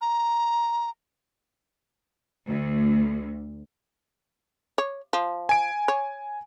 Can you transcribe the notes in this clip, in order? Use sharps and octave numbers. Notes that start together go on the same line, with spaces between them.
A#5
D2
C#5
F3
G#5 D7
C#5